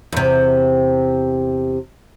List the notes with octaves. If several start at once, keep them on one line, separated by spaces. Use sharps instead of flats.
E2 C3